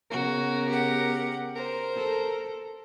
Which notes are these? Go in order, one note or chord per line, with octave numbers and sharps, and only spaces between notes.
C#3 B3 F#4 A#4
G4 F#5
A#4 C5
A4